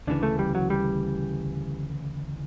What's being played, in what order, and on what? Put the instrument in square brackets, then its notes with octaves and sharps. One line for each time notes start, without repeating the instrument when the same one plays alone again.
[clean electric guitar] D2 C#3 E3 [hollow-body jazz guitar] D4
[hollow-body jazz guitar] A3
G3
F#3
G3